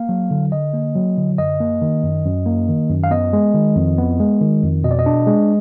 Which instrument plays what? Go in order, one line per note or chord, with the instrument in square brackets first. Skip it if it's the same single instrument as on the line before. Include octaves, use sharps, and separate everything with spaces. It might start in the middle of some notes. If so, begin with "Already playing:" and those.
Already playing: [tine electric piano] A#3 F5
F#3
D3
D3 D#5
A#3
F#3
D3
F#2 D#5
A#3
D#3
F#2
F#2
A#3
D#3
F#2
F5
B3 D#5
G#3
D#3
F2
B3
G#3
D#3
F2
B2 D#5
D5
D#5
D4
G#3